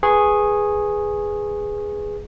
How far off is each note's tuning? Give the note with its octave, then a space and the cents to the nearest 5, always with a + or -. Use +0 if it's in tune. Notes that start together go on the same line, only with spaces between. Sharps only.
G#4 +0 B4 +0 C#6 -25